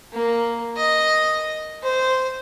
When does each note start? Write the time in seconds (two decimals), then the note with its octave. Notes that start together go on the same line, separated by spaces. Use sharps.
0.13 A#3
0.77 D#5
1.83 C5